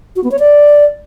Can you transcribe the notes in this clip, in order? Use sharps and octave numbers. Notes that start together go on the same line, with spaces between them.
F#4
B3
C#5
D5